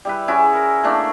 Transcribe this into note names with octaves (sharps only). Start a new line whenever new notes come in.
G3 E4 B4
C#4 E4 F#4 G#4
A#4
A3 A#3 D4 E4